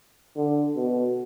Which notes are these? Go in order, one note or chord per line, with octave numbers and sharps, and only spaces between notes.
D3
B2